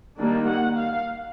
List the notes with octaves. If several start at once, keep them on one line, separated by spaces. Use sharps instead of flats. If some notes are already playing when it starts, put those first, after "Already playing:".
D#3 G3 A#3 D4
F#5
F5